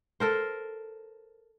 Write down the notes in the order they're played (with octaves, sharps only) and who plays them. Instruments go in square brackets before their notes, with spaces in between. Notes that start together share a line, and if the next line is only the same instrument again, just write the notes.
[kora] A4 A#4 C5